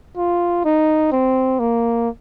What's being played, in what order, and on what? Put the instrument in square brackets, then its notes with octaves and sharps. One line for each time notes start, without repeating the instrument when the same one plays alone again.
[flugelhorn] F4
D#4
C4
A#3